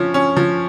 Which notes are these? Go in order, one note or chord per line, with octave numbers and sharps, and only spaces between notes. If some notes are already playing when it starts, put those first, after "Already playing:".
Already playing: F3 C#4
C#4
F3